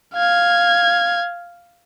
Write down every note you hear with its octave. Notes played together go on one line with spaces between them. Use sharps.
F5 G#6